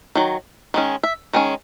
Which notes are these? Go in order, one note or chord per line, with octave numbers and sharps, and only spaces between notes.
D#3 F#3
D#3 G#3 C#4
E5
D#3 G#3 C#4